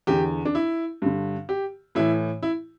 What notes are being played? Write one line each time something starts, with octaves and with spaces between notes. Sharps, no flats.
E2 D3 G4
D4
E4
G2 D3
G4
A2 E3 E4
E4